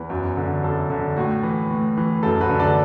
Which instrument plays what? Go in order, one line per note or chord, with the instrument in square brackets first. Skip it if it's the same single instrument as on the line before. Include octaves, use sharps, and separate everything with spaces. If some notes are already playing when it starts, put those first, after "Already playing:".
Already playing: [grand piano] E2 E3
F#2
D3
F#2 A4
D3
A2 F#4
E3
A2
E3
F#2 A4
F#4 B4
D3
A4 D5